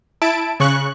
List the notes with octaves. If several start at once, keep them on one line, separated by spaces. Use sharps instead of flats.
E4 A5 D7
C#3 C#6 F#6